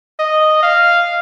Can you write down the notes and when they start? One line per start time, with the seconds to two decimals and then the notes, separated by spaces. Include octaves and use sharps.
0.19 D#5
0.63 F5